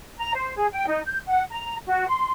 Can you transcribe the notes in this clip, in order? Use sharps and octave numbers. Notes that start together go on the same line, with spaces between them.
A#5
C5
G#4
G5
D#4
G6
F#5
A#5
F#4
C6